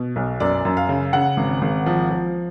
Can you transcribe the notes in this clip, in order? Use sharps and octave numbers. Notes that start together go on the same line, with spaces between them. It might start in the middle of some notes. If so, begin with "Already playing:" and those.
Already playing: B2
B1
F#2 D5
F#2
F5
C#3
C#3 F#5
G#1
G#1
F3
F3